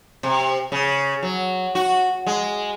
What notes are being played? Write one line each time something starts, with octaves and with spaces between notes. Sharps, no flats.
C3
C#3
F#3
F#4
G#3